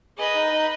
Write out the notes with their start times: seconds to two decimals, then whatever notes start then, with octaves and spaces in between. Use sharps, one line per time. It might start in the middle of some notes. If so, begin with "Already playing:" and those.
0.18 G#4 B4 D#5
0.35 D#4
0.52 D#4